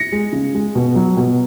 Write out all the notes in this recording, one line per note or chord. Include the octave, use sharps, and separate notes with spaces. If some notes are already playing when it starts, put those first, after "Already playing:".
Already playing: A#6 C#7
G#3
C#3
G#3
B2
F#3
B2